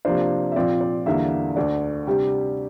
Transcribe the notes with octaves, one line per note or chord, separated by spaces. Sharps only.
C3 F3 A#3 D4 C5
E5
A#2 F3 C4 D5
D5
E2 D3 G3 A#3 E5
D2 D3 A3 D4 D5
C3 G3 D4 G4